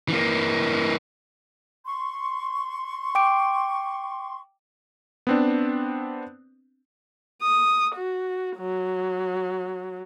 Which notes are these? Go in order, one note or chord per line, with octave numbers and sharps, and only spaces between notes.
E3 A#3
C6 C#6
G5 D6 D7
B3 C4 D4
D#6
F#4
F#3